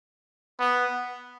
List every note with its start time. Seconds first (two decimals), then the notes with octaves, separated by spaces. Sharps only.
0.60 B3